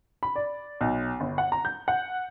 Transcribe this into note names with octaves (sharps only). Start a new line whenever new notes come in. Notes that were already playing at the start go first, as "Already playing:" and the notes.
B5
D5
B1
G1
F#5
A#5
G6
F#5